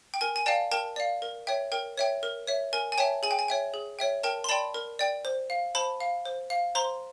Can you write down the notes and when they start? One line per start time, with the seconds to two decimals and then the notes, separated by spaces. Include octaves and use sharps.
0.14 G5
0.21 A#4 G#5
0.36 G#5
0.46 D5 F5 G5 A5
0.72 A#4 G5 A5
0.96 D5 F5
1.22 A#4
1.47 C#5 E5 G5
1.72 A#4 G5
1.97 C#5 E5 G5
2.23 A#4
2.47 C#5 E5
2.73 A#4 G#5
2.92 G#5
2.98 C#5 E5 G5 A5
3.23 G#4 G#5
3.31 G5
3.39 G#5
3.48 C#5 E5 G5
3.74 G#4
3.99 C#5 E5 G5
4.23 A#4 G5 A5
4.44 C6
4.49 D5 G5 A5 B5
4.74 A#4
4.99 D5 G5
5.25 C5
5.50 F5
5.75 C5 A5 B5
6.00 F5
6.25 C5
6.50 F5
6.75 C5 A#5 C6